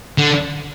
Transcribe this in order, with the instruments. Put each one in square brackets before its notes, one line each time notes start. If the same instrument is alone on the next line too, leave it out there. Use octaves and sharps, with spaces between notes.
[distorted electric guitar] D3